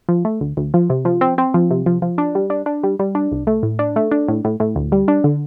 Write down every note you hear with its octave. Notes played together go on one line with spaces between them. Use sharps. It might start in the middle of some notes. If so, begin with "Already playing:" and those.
F3
A3
D2
D2
F3
C3
F3
C4
C4
F3
C3
F3
F3
D4
G3
D4
D4
G3
G3
D4
C2
A3
A2
D4
A3
D4
A2
A2
A2
D2
G3
D4
D3